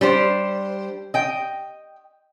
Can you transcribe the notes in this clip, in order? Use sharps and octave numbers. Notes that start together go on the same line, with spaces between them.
G3 D4 C5
D#5 G5